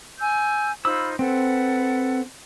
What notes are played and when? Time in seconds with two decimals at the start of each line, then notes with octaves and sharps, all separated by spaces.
0.19 G#5 E6 G6
0.85 D#4 F4 C5 B5 E6
1.19 C4 A4 B4 F#5